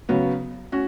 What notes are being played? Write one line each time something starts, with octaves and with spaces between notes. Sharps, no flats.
C#3 F#3 B3
C#4 F#4